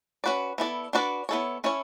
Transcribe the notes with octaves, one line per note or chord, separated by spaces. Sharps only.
C#4 F#4 B4 D5
B3 E4 A4 D5
D4 F#4 B4 D5
B3 E4 A4 C#5
C#4 E4 A4 C#5